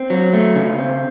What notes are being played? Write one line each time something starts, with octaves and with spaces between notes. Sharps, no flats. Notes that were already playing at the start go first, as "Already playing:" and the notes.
Already playing: C4
F#3
A3
C#3
C4